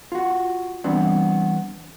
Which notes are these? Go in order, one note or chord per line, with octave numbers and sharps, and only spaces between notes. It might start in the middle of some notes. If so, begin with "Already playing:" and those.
F4 F#4
E3 G3 B3 C4 D4